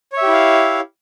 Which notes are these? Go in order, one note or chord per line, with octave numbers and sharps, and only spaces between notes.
E4 G4 C#5 E5 F5